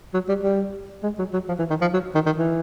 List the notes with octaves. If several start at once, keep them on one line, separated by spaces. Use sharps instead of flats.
F#3
G3
G3
G#3
F#3
F#3
F3
E3
D#3
F3
F#3
D#3
D#3
E3